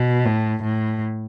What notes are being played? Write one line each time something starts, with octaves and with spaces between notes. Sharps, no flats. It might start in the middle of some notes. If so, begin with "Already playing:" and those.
Already playing: B2
A2
A2